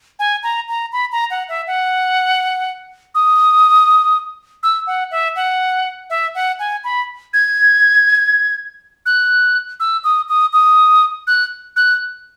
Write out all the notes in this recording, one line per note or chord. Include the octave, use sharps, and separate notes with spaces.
G#5
A#5
A#5
B5
A#5
F#5
E5
F#5
D#6
E6
F#5
E5
F#5
E5
F#5
G#5
B5
G#6
F#6
E6
D#6
D#6
D#6
F#6
F#6